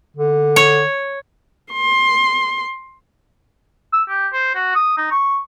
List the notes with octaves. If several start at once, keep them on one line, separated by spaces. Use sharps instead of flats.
D3
C#5
C6
E6
G4
C5
F#4
D#6
D#4
C#6